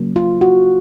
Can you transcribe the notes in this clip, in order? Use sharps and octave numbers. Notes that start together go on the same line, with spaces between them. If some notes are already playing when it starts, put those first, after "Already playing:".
Already playing: C#3 F#3 A#3
F4
F#4